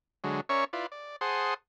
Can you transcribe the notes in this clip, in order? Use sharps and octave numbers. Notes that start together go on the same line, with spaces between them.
D3 F#3 G#3
C#4 A#4 C#5 D5 E5 C#6
E4 F4 B4 D5
D5
G#4 C5 F#5 A5 C6 D#6